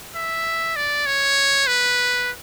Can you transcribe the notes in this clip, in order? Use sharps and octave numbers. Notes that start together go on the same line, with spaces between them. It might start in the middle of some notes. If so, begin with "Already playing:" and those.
E5
D5
C#5
B4